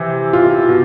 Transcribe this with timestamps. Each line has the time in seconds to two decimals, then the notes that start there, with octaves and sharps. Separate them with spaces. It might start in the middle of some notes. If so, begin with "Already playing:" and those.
Already playing: C3 E3
0.33 F4
0.68 B2